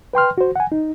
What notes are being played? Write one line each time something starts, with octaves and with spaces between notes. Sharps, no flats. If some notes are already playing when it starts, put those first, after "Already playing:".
B4 G5 C6 F6
F#4 C5
F#5 G#5
D#4